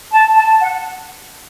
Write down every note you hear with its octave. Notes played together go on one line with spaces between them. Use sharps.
A5
A5
F#5